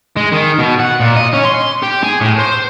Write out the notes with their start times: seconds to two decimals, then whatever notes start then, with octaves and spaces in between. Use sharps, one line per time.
0.17 G#3
0.32 D#3
0.59 B2
0.80 F#5
1.00 A#2
1.16 D#5
1.33 C#4
1.45 C6
1.83 G4
2.03 G#4
2.21 A2
2.39 C5